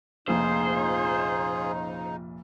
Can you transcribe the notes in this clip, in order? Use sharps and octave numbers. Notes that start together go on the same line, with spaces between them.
F1 A#1 A#2 C#3 D#4 F4 G#4 C5